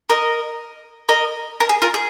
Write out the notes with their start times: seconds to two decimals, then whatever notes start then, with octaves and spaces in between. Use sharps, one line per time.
0.10 A#4 D#5
1.09 A#4 D#5
1.60 A#4
1.69 G#4
1.82 F4 A#4
1.94 G#4